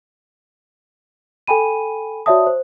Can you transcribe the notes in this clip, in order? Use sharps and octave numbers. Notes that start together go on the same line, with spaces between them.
A4 G5 G#5 B5 D#7
F#4 C#5 D5 E5 A5 D#6
C5